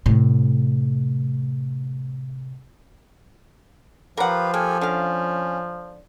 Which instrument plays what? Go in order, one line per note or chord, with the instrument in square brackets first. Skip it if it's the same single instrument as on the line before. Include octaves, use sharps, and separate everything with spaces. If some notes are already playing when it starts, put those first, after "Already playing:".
[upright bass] A2 C3
[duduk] F3 [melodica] G4 B4 F5 [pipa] A#4 F#5
[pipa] A#3 [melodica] G4 A4 G#5
[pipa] D3 F5 [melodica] C#4